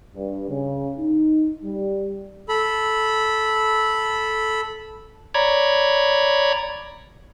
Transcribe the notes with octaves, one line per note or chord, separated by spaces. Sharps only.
G2
C#3
D#4
G3
A4 B5
C#5 D5 A#5 B5 G#6